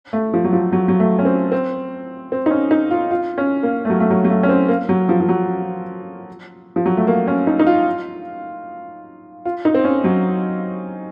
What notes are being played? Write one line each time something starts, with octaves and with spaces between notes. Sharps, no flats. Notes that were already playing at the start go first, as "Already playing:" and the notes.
A3
F3
F#3
F3
F#3
F#3
A3
C#4
C4
C4
C4
D#4
C#4
D#4
F4
F4
C#4
A#3
A3
F#3
A3
F#3
F#3
A3
C#4
C4
A#3
F#3
F3
F3
F#3
F3
F#3
A3
A#3
C#4
D#4
D#4
F4
F4
D#4
C4
C#4
F#3